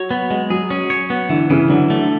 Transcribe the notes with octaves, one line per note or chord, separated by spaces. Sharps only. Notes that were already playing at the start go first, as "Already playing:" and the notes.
Already playing: F#3 C#5
B3
G#3
F#3 G#4
C#4
C#5
B3
D3 E3
C#3 E3
D3 F#3
A3